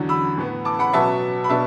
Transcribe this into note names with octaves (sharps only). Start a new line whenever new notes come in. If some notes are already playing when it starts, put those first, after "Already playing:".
Already playing: E2 D3 F#3
B5 E6
A2 E3 B3
A5 D6
F#5 B5
B2 F#3 B3 E5 A5
B5
B2 B3 D4 E5 A5